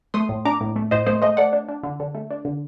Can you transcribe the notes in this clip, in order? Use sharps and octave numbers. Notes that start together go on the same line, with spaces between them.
A3 C6 D#6
A2
D4 A#5 D6
A2
A3
A2 C5 D#5
A3 C5 D#5
A3 C5 D#5
A3 D5 F#5
D4
D4
D3
D3
A3
D4
D3